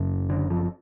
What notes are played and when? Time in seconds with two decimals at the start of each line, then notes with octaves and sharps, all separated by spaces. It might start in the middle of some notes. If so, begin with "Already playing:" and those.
Already playing: F#1 F#2 C#3
0.30 D3
0.50 F3